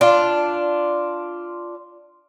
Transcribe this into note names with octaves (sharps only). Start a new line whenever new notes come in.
D4 F4